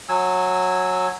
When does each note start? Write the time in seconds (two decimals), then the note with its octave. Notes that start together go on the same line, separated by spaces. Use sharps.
0.09 F#3 G#5 E6